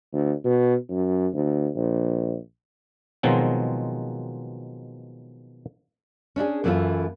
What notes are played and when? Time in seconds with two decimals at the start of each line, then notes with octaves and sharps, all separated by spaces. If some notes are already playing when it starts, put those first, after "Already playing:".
0.13 D2
0.44 B2
0.89 F#2
1.34 D2
1.76 A#1
3.23 B2 D#3 F3 F#3 G#3 C4
6.36 C#4 D4 E4 G#4
6.64 F#2 E3 A3 C#4 E4 F4